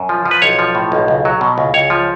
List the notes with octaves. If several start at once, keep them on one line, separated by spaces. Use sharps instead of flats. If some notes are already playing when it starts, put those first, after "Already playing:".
Already playing: F#2
F3
F3
B4
B1 C#5
F3
A2
B1
C#2
F#3
B2
C#2
C#2 C#5
F3